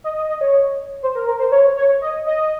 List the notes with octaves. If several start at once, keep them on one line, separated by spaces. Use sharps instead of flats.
D#5
D#5
D#5
C#5
C5
A#4
A#4
C5
C#5
C#5
D#5
D#5